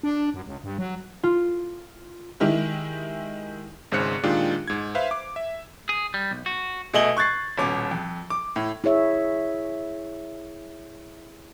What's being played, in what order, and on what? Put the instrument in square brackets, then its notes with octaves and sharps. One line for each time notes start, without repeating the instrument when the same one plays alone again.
[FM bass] D4
F#2
C#2
G2
F#3
[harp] F4
[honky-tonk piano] D#3 G#3 E4 G4
[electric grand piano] G#1 G#2 C#3 C5 F#6 C#7
A#2 D#3 G#3 D4 F4 G4
G#2 G#6
B4 C5 E5 F5
D6
E5
[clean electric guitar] G#4
G3
B1
F#4
[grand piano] B2 A3 D#5 G#5 F#7 G7
C#6 F#6 G#6 A6 C7
D#1 B2 C#4 D6
F2
D6
A2
[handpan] E4 G#4 C#5 E5